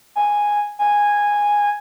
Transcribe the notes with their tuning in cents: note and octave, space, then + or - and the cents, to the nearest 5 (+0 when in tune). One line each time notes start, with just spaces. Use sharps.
G#5 -5
G#5 -10